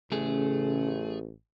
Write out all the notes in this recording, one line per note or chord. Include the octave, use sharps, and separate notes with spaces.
A1 C#3 A3 G#4